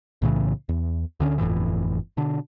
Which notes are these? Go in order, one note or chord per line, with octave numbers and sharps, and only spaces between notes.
B1 A2 C#3 E3
E2
D2 D3 C#4
G1 F2 A2 E3
B2 D3 D4